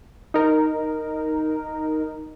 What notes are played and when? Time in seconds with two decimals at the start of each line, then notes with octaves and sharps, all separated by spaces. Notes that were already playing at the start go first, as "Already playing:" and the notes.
0.34 D#4 A#4